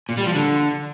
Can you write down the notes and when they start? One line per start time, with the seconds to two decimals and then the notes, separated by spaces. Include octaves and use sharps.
0.09 A#2
0.17 G3
0.26 F3
0.35 D3